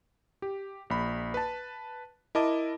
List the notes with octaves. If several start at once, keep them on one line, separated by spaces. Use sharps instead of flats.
G4
A#1 B5
B4 A5
E4 A#4 D#5 A5 D6